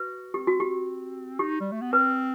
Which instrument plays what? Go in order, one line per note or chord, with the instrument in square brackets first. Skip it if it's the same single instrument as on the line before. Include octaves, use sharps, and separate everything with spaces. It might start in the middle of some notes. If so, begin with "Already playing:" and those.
Already playing: [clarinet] F#4 [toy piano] B4
[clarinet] C4 [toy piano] G4
[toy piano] F#4
G4
[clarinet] D#4 [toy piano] G4
[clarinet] G3
A3
B3
[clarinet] C4 [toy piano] B4